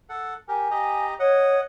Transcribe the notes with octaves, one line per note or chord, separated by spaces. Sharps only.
A4 F#5
G4 A#4 G#5
G4 D#5 A#5
C#5 D#5 F#5